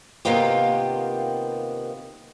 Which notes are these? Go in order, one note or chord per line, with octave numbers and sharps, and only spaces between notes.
C3 D#3 A#3 B3 F4 G4